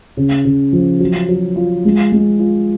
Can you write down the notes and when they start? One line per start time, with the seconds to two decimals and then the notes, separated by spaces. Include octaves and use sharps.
0.17 C#3
0.45 C#3
0.73 F3
1.00 F#3
1.28 F#3
1.56 F4
1.85 G#3
2.12 G#3
2.39 F4